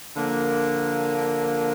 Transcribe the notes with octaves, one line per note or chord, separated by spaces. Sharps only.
D3 F3 A#3